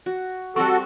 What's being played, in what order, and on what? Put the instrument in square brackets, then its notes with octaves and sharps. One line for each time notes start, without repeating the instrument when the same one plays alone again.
[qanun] F#4
[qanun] G3 C4 [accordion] F#4 A4 [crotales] C#6